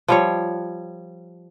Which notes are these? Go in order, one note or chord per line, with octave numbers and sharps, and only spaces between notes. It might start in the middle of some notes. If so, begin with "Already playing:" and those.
F3 G3 C#5